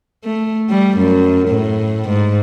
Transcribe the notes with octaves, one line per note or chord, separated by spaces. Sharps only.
A3
G3
F#2
A2
G#2